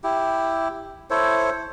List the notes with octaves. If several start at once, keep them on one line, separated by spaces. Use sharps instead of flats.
E4 G4
E4 A4 C5 C#5